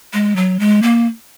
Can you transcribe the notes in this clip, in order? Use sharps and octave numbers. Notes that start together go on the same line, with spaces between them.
G#3
F#3
G#3
A#3